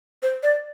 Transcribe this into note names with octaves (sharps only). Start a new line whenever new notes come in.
C5
D5